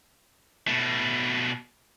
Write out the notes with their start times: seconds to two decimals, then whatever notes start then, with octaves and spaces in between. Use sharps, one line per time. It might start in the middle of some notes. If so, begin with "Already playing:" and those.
0.67 B2 A3